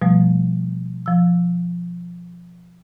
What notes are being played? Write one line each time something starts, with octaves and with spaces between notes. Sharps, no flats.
B2 F3 G3 A3
F3 E6